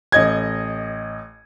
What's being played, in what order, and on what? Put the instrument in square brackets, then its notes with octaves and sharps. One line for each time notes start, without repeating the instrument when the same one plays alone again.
[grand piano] A1 D#5 G#6